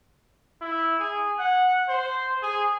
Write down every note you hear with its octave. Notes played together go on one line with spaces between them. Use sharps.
E4
G#4
F#5
C5
G#4